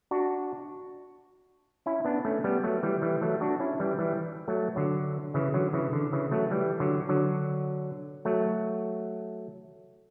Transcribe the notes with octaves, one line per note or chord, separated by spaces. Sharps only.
D4 F#4
C#4 E4
B3 D4
A3 C#4
G3 B3
F#3 A3
E3 G3
E3 G3
F#3 A3
D4 F#4
C#4 E4
E3 G3
E3 G3
F#3 A3
D3 F#3
C#3 E3
D3 F#3
C#3 E3
D3
C#3 E3
F#3 A3
E3 G3
D3 F#3
D3 F#3
F#3 A3